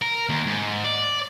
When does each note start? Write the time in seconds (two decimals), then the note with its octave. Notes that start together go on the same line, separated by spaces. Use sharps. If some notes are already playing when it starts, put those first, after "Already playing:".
0.02 A#4
0.29 D#2
0.47 G#2
0.84 D5